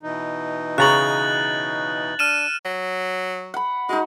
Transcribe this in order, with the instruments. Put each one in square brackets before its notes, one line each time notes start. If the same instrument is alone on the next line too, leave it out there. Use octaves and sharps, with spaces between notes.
[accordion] B2 E3 D#4
[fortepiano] C#3 A#5 C#6 [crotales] F#6 A6 F#7
[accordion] D4 [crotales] F6 D#7 E7
[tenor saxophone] F#3
[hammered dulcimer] F#5 B5
[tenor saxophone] G#3 [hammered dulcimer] D#4 F#4